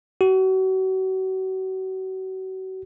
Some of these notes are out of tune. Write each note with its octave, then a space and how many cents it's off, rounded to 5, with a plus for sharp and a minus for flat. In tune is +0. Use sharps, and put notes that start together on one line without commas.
F#4 +35